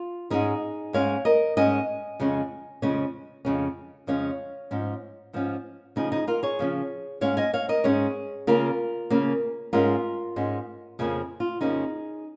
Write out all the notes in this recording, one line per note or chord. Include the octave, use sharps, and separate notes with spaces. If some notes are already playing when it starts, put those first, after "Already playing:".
Already playing: F4
G#2 G#3 C#4 D#4 G#4
G#2 G#3 C#4 C#5 F5
A#4 D#5
G#2 G#3 C#4 D#5 G#5
F2 C#3 G#3 C#4
F2 C#3 G#3 C#4
F2 C#3 G#3 C#4
F2 C#3 G#3 C#4 C#5 F5
G#2 F3 C#4
G#2 F3 C#4
C#3 F3 C#4 D#4 G#4
D#4 G#4
F4 A#4
G#4 C#5
C#3 F3 C#4
G#2 G#3 C#4 C#5 F5
D#5 G#5
C#5 F5
A#4 D#5
G#2 G#3 C#4 G#4 C#5
C#3 A#3 C#4 F4 A#4
C#3 A#3 C#4
G#2 G#3 C#4 F4 A#4
G#2 G#3 C#4
F2 C#3 F3 A#3 C#4 D#4 G#4
F4
F2 C#3 F3 A#3 C#4 D#4 G#4